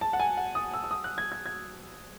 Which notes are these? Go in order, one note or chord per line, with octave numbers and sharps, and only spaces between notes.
A5
F#5
G#5
F#5
D#6
E6
E6
D#6
F#6
G#6
G#6
G#6